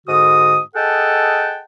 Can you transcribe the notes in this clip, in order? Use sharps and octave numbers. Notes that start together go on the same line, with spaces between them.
G#2 D3 F#4 D#6
G#4 A4 D#5 F#5 G5 A5